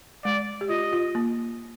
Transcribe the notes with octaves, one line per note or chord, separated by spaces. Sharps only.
G#3 D5
G4
F4 D#5
F4
A#3